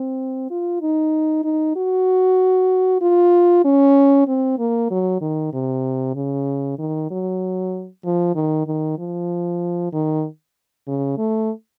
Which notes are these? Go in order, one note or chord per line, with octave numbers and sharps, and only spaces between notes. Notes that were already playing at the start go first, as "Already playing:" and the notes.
Already playing: C4
F4
D#4
D#4
F#4
F4
C#4
C4
A#3
F#3
D#3
C3
C#3
D#3
F#3
F3
D#3
D#3
F3
D#3
C#3
A3